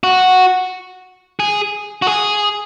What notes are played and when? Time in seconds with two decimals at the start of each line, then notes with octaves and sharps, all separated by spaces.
0.03 F#4
1.40 G#4
2.02 F#4
2.07 G#4